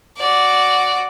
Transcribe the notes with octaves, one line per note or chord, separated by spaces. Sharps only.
F#4 D5